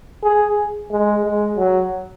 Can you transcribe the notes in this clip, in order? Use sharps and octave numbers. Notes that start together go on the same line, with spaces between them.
G#4
G#3
G#3
F#3